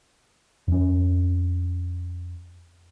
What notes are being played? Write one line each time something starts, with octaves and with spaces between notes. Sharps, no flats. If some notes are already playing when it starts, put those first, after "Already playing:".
F2 C#4